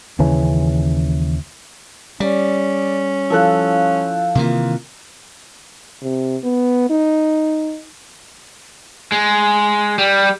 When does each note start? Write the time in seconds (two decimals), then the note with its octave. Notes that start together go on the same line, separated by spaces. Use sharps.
0.19 D#2 C#3 E3 C#4
2.20 G3 C#4 D5
3.30 F3 E4 A4 F5 F#6
4.35 C3 D#3 E3 A#3 F4
6.02 C3
6.44 B3
6.90 D#4
9.12 G#3
9.99 G3